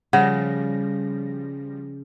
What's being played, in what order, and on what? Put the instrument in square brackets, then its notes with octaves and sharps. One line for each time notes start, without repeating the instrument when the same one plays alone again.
[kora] C#3 [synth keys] F3 G3 A#6 [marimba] F#5